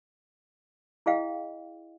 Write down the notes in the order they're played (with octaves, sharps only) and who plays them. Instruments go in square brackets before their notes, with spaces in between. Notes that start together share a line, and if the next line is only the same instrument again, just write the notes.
[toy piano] E4 G#4 D#5 F5 G5